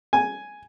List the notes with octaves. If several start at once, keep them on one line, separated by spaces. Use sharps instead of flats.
G#5